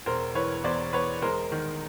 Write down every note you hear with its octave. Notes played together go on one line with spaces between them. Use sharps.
E1 A#4 C5
E3 B4 C#5
E2 C5 D5
E2 B4 C#5
G#3 A#4 C5
D#3